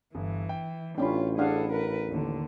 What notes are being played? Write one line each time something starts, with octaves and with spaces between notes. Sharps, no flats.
G1 E3
G5
A1 C#4 D4 F4 G5 B5
D4 G#4 A4 F5 F#5
A#4 B4
D#2 D3